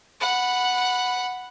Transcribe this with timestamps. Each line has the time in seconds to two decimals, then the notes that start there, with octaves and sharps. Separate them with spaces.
0.20 F#5 B5